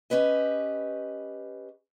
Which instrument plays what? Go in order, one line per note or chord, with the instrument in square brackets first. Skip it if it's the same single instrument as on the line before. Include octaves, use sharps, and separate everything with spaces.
[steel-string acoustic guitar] C#4 G4 B4 D#5